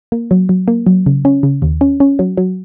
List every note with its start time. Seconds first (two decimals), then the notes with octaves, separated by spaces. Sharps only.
0.12 A#3
0.31 F#3
0.49 F#3
0.68 A#3
0.87 F#3
1.06 C#3
1.25 C#4
1.43 C#3
1.62 D#2
1.81 C#4
2.00 C#4
2.19 F#3
2.37 F#3